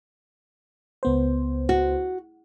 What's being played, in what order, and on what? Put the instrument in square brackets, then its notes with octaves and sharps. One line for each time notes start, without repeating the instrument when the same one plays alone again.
[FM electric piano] C#2 B3 C5
[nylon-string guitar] F#4